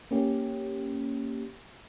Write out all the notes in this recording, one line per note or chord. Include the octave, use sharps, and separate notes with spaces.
A#3 C#4 G4